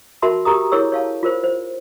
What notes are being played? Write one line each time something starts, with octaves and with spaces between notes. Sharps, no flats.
F#4 A#4 E5 A5 B5 C6
G4 A#4 A#5 D#6
E4 G#4 A#4 C#5 C#6 E6
C#5 F5 A5
F4 A#4 C5
C5